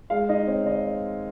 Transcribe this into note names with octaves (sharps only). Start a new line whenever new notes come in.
G#3 F5
D#4 D#5
C4 C#5
D#3 D#5